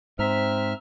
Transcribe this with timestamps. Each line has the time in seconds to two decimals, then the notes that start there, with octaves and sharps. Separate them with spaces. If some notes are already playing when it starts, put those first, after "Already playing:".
0.19 G#2 C4 C5 E5 A#5 F6 B6